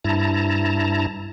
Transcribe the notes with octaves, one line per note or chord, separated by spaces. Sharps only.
G2 E4 A5 A#5